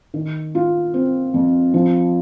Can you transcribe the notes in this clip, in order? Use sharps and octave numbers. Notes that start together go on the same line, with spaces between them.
D#3
F4
C4
F2
F3